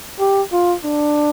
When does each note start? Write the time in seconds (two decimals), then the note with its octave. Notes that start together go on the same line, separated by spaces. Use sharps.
0.19 G4
0.52 F4
0.85 D4